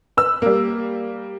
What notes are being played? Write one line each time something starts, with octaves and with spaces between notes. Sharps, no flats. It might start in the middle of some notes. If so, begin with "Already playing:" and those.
B4 E6
G3 A#3